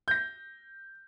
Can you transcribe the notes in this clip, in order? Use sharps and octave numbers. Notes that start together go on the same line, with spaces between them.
G6 A#6